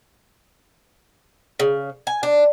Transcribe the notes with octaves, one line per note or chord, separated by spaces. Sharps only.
C#3
G#5
D4